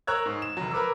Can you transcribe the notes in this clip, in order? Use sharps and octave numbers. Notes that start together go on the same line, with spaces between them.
A#4 C#5 A#5 E6 F#6 G#6
G#2
E7
F1 F#3
A#4 B4 D6 E6